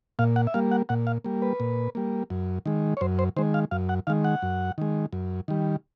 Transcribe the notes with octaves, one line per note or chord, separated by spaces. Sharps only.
A#2 F5
F#5
E5
G3 A#3 F5
F#5
A#2 F#5
F5
G3 A#3
B4
A#2
G3 A#3
F#2
D#3 G#3
C#5
F#2 C5
C5
D#3 G#3 C5
F5
F#2 F5
F#5
D#3 G#3 F5
F#5
F#2
D#3 G#3
F#2
D#3 G3